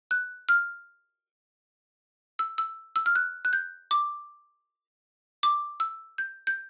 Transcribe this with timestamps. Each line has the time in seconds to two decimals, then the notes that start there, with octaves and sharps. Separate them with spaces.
0.11 F#6
0.49 F6
2.39 E6
2.58 E6
2.96 E6
3.06 F6
3.15 F#6
3.45 F#6
3.53 G6
3.91 D6
5.43 D6
5.80 E6
6.18 G6
6.47 G6